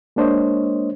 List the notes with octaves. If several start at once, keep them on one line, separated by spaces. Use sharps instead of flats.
G#3 A#3 D4 C5 C#5 D#5